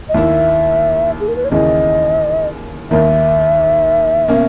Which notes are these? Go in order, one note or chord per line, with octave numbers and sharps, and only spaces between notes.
D#5
D#2 D#3 A#3 E4 E5
G#4
A#4
B4
C#5
D#2 C#3 E3 D#5
D#2 D#3 A#3 E5
B2 A#3 C#4